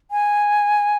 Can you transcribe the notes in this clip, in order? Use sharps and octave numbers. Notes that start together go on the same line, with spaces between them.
G#5